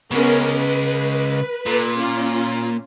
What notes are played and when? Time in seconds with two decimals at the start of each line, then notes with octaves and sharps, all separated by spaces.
0.11 C#3 G#3 B3 C#4 A#4
0.57 B4
1.66 A#2 A4 B4
1.96 C#4 F4